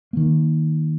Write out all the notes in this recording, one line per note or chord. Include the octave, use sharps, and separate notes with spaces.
D#3 A#3